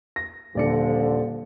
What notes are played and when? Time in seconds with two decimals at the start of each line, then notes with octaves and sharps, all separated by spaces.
0.16 A#6
0.55 D#1 D3 F3 D5 C#7